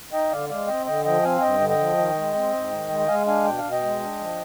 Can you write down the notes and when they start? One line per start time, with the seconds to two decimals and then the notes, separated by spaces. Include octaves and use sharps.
0.13 D#4 D#5 G5
0.31 D3 D5 F5
0.49 G#3 D5 F5
0.67 C4 D#5 G5
0.86 D3 D#5 G5
1.05 F3 D#5 G5
1.23 C4 F5 G#5
1.38 G#5
1.42 G2 D#5 G5
1.60 D3
1.69 D#5 G5
1.79 F3
1.97 D#3
2.16 G#3
2.34 C4
2.53 G#2
2.72 D#3
2.89 G#3
3.00 G5
3.08 G#3 F5 G#5
3.26 D4 F5 G#5
3.45 B2 G5
3.58 F5
3.64 B2
3.72 D#5 G5
3.83 G#3
4.00 D4
4.19 F3